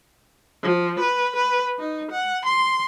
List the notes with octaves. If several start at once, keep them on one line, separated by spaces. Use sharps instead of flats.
F3
B4
B4
D#4
F#5
C6